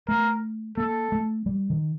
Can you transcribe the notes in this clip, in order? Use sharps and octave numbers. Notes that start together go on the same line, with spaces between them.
A3 A#4
A#3 A4
A3
G3
D#3